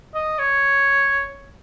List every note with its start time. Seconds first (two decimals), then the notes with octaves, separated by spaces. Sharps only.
0.15 D#5
0.39 C#5